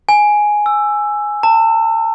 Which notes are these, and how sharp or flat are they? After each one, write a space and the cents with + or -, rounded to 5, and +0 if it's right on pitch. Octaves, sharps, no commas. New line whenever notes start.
G#5 +5
E6 +10
A5 +45